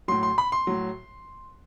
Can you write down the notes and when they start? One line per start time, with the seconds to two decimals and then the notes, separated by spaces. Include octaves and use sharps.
0.08 A2 F#3 C6
0.23 C6
0.38 B5
0.52 C6
0.67 A2 F#3